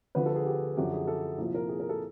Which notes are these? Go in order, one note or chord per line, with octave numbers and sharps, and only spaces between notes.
D2 D3 F3 B4
A4
G#4
G4
F#2 D3 F3 G4
G#4
A4
C2 A#2 F3
A#4
G#4
A#4
A4